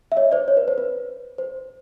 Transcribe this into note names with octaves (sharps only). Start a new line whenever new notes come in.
E5
C#5 D#5
C5 D5
C#5
B4
C5
B4
C5